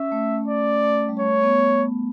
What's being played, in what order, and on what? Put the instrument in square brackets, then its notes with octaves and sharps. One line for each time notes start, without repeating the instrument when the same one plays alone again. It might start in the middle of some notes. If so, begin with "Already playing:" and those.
Already playing: [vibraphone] C#4 [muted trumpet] E5
[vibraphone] A3
[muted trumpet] D5
[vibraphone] A3
G3
[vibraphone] A3 [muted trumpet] C#5
[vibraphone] B3